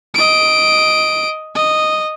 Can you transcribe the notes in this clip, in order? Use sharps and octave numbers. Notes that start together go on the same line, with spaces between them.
D#5 D7
D#5